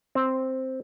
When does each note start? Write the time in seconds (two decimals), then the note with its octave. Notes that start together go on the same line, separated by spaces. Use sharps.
0.15 C4